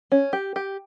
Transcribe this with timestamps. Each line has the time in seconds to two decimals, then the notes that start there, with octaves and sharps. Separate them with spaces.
0.12 C#4
0.33 G4
0.56 G4